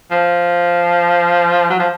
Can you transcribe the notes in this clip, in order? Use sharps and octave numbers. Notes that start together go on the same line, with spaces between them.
F3
F#3
F3